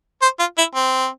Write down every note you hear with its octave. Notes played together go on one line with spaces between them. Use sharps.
C5
F4
E4
C4